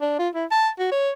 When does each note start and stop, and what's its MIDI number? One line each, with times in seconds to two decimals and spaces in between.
0.01 0.16 62
0.19 0.29 65
0.34 0.45 64
0.52 0.69 81
0.79 0.90 66
0.92 1.11 73